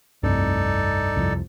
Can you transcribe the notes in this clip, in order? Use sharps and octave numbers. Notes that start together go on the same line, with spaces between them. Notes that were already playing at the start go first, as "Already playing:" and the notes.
F1 C2 G2 D#4 A4 D5
C2 F2